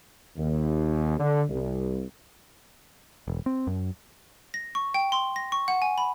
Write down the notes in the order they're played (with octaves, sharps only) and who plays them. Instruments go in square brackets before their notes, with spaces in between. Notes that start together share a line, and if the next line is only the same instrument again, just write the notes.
[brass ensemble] D#2
D3
C2
[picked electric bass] E1
C4
F#2
[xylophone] A#6
C#6
G5
C6
A#6
C#6
F#5
G#5
B5